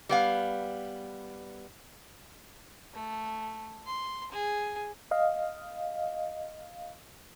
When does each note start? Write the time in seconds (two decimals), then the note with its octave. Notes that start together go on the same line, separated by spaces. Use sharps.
0.09 G3 B3 F5
2.94 A3
3.86 C6
4.32 G#4
5.11 D#5 F5